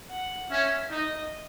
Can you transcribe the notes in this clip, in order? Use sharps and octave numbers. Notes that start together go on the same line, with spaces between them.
F#5
C#4 E5
D#4 D#5